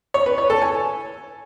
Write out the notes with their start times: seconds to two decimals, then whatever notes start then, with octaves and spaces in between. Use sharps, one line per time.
0.14 C#5
0.26 B4
0.38 C#5
0.50 A4
0.62 G#5